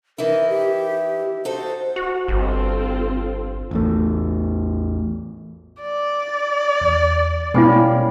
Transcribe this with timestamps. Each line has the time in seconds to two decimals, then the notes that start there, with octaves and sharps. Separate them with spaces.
0.18 E3 D#4 E4 A#4
0.50 G4
1.45 D#4 F#4 A4 C5
1.96 F#4
2.28 G1 C4 F4 A4
3.71 A1 E2 A3
5.82 D5
6.81 E2
7.54 B2 G3 G#3 A#3 B3 C#4 E4